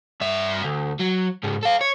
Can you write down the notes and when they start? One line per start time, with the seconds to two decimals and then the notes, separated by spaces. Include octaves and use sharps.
0.21 G2 E5
0.64 D2
1.00 F#3
1.43 G#2 C#3
1.63 A4 F5
1.81 C#5